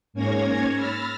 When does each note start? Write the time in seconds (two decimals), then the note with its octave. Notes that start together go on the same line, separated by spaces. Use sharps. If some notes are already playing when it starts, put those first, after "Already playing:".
0.13 G#2 A#3 C#4 C#5 G#6 A#6
0.73 B5 E6 F6 A6 A#6